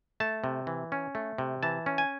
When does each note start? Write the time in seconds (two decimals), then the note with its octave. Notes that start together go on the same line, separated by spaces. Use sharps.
0.20 A3 A5
0.44 C3
0.67 E3
0.92 C#4
1.15 A3
1.38 C3
1.63 E3 A5
1.86 C#4
1.98 G#5